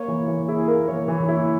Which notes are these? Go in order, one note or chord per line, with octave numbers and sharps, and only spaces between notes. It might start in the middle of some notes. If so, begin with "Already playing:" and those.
Already playing: A#3 C#5
E3
E3
E4 G#4
A#3 A#4
E3 C#5
E3
E4